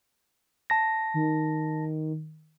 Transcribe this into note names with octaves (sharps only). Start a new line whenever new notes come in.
A5 A#6
D#3